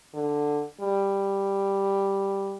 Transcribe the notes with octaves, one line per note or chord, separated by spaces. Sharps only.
D3
G3